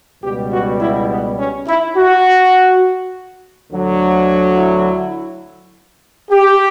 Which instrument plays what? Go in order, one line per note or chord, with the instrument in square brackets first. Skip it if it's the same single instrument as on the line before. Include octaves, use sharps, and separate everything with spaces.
[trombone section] C#2 B2 G3 G4
F#4
E4
B3
C#4
E4
F#4
D2 D3 F#3
E4
G4